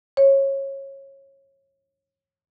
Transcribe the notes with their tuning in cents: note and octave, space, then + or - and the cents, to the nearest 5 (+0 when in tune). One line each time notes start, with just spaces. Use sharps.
C#5 -20